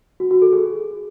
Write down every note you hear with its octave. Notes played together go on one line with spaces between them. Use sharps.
F#4
F#4
A4
G#4